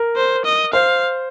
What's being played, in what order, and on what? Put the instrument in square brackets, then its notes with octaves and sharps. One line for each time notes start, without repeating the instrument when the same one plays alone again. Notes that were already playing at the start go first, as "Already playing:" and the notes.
Already playing: [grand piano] A#4
[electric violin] C5
D#5
[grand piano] C5 [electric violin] F5